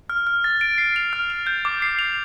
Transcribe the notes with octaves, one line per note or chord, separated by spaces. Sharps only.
F6
F6
A6
D7
C7
F7
F6
F7
G6
D6
C7
F7